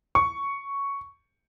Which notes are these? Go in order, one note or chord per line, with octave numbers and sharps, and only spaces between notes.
C#6